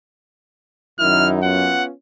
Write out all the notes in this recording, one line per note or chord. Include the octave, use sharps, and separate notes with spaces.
F#2 D#3 D#4 E4 F6
B3 C#4 F4 F#5